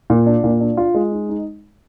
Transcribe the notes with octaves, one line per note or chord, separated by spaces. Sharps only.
A#2
D4
A#2
D4
F4
G#3
D#4
D#4